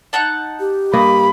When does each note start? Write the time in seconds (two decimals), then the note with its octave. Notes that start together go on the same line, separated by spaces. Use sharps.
0.13 D#4 F#5 A5
0.60 G4
0.94 G2 A#3 D#5 B5